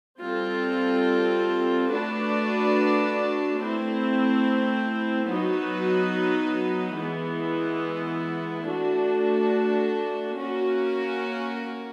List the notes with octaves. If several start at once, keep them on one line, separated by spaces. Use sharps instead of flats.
G3 C4 F4 A4
A3 D4 F#4 B4 D5
A3 C4 E4
F#3 B3 D#4 F#4 B4
E3 G#3 B3 E4
A3 D4 F#4
A#3 C#4 F#4 A#4